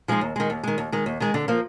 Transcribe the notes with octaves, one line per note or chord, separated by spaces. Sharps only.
F3 G#3 D#4
D#2
D#3 G#3
D#2
D#3 G#3
D#2
D#3 G#3
D#2
D#3 G#3
D3
F3 A#3